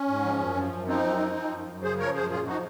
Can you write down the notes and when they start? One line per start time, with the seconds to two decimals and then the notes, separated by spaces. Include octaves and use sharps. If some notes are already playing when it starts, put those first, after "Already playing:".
Already playing: C#4
0.08 G#2
0.25 F3
0.39 F#2
0.56 F3
0.72 F#2
0.87 F3 C4 D#4
1.03 F#2
1.19 F3
1.36 F3
1.51 F#2
1.67 F#2
1.82 C#3 G#4 C5
1.99 F3 A#4 C#5
2.14 F#2 G#4 C5
2.30 A#2 F4 G#4
2.46 F3 D#4 F#4